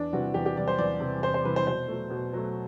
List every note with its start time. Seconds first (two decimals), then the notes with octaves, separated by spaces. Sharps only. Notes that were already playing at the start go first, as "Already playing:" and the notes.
Already playing: E2 D4
0.13 C3 E3 G3 F#4
0.34 E2 G4
0.46 G4
0.56 C3 E3 G3 D5
0.68 C5
0.78 E2 D5
1.00 C3 E3 G3
1.23 E2 C5
1.34 C5
1.44 C3 E3 G3 B4
1.56 C5
1.67 B2 C5
1.88 F#3 A3
2.10 B2
2.33 F#3 A3